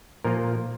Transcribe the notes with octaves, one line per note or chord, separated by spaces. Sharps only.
A#2 F3 A#3 F4 A#4